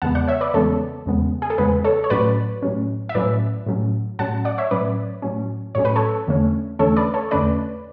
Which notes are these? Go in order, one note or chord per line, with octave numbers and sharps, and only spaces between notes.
E2 C#3 G#3 B3 F#5 A5
D5 F#5
C#5 E5
B4 D5
E2 C#3 G#3 B3 A4 C#5
E2 C#3 G#3 B3
G#4
A4
E2 C#3 G#3 B3 G#4 B4
A4 C#5
C#5
A2 F#3 C#4 B4 D5
A2 F#3 C#4
E5
A2 F#3 C#4 B4 D5
A2 F#3 C#4
A2 F#3 C#4 F#5 A5
D5 F#5
C#5 E5
A2 F#3 C#4 B4 D5
A2 F#3 C#4
A2 F#3 C#4 C#5
B4
A4 C#5
E2 D3 A3 C#4
E2 D3 A3 C#4 A4 C#5
B4 D5
A4 C#5
E2 D3 A3 C#4 B4 D5